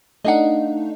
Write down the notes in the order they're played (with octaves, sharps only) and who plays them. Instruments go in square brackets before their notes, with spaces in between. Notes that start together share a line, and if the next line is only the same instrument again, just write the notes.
[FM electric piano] A3 D4 D#4 [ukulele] D#5 F5 F#5